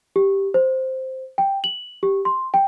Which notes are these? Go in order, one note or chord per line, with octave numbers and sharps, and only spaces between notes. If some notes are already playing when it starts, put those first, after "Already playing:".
G4
C5
G5
F#7
G4
C6
G5